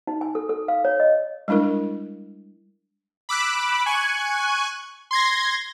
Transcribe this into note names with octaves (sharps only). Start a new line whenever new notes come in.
D#4
G#5
A4
A4
F5
C#5
D#5
G3 G#3 D4 E4 A#4
B5 D6 E6 F#6
G#5 C#6 F#6 G#6
C6 G#6 A#6